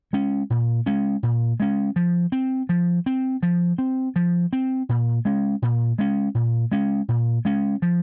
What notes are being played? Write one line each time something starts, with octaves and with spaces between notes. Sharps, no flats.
G#3 C#4
A#2
G#3 C#4
A#2
G#3 C#4
F3
C4
F3
C4
F3
C4
F3
C4
A#2
G#3 C#4
A#2
G#3 C#4
A#2
G#3 C#4
A#2
G#3 C#4
F3